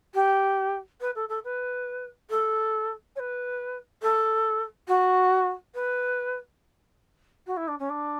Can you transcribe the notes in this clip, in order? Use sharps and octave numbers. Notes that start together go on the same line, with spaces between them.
G4
B4
A4
A4
B4
A4
C#5
B4
A4
F#4
B4
F#4
E4
D4
C#4
D4